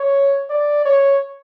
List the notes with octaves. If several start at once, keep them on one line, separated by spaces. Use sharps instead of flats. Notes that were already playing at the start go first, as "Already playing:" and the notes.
Already playing: C#5
D5
C#5